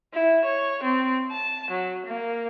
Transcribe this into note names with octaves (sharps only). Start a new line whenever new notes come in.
E4
C#5
C4
A5
F#3
A#3